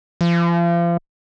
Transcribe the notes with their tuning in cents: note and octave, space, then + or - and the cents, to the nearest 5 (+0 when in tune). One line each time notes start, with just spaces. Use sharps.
F3 -35